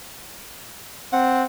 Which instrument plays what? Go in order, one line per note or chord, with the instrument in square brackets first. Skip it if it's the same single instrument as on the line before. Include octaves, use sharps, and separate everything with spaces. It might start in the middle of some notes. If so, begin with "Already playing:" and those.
[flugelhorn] C4 [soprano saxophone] F#5